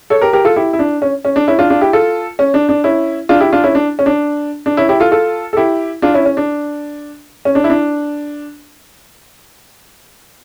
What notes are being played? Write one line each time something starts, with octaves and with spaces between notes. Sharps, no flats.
A4 C#5
G4 A#4
G4 A#4
F4 A4
E4 G4
E4
D4
C#4
C#4
D4
C#4 E4
D4 F4
D4 F4
E4 G4
F4 A4
C#4
D4
D4
C#4 E4
D4 F4
E4 G4
D4 F4
C#4 E4
D4
C#4
D4
D4
C#4 E4
E4 G4
F4 A4
F4 A4
A4
E4 G4
D4 F4
C#4 E4
C#4
D4
C#4
D4
E4
D4